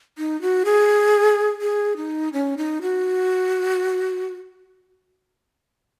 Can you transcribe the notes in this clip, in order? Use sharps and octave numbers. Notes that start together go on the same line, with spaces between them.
D#4
F#4
G#4
G#4
D#4
C#4
D#4
F#4